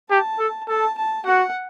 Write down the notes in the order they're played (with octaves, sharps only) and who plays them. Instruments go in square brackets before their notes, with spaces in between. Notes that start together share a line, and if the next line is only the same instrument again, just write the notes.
[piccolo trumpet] G4 [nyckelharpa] A5
[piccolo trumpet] A4
[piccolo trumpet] A4 [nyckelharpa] A5
[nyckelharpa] A5
[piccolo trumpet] F#4 [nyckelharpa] F#5